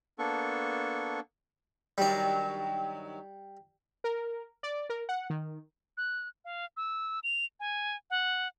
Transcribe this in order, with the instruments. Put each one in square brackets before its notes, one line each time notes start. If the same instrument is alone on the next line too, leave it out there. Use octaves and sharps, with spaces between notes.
[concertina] A#3 B3 D4 A4 C#6
[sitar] G2 D#3 F#3 [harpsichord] G3 D5
[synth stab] A#4
D5
A#4
F#5
D#3
[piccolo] F#6
F5
E6
F7
G#5
F#5